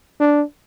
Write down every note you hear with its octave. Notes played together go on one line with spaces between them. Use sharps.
D4